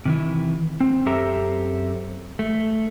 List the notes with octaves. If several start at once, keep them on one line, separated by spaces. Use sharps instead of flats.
C3 D#3 E3
C4
F#2 C4 G4 A4 E5 A#5
A3